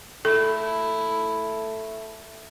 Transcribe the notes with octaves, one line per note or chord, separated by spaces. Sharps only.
A3 E4 A4